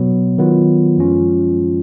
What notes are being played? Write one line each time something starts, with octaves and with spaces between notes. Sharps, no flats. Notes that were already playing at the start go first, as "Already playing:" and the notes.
Already playing: B2 F#3 B3
D#3 F#3 B3 F4
F#2 F3 G#3 C#4 F4